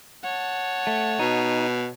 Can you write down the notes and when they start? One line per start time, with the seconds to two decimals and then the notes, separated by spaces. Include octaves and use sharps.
0.24 C#5 F#5 A5
0.87 A3
1.19 B2 D#4